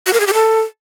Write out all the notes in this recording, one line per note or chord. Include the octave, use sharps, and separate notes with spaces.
F#4
A#4
G#4
G4
A4